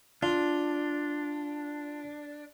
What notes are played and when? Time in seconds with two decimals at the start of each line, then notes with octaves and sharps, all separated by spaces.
0.23 D4 F4